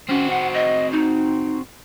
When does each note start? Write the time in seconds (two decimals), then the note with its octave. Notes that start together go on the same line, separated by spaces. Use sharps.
0.09 C4 C#4 F#4
0.30 F#5
0.54 D#5
0.92 D#4